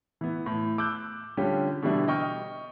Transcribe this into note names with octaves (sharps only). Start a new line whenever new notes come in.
E3 B3
A2
D6 E6 F#6 G6
D3 G3 C#4 F4 G4
B2 D3 E3 G3 D4 E4
D#5 G5 C#6 F6